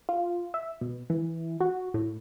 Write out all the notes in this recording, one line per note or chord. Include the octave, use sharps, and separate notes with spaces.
F4
E5
B2
E3
F#4
A2